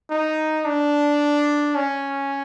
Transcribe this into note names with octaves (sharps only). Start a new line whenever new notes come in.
D#4
D4
C#4